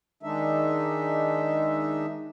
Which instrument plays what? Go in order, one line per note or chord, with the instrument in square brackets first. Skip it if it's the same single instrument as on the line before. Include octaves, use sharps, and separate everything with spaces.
[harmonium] D#3 G#3 D4 D#4 E5